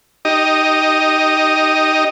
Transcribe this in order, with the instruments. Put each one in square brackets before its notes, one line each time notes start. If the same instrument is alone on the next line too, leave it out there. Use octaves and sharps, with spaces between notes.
[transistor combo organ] D#4 G4 D#5